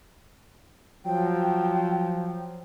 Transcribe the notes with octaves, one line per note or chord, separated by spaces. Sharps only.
F3 F#3 G5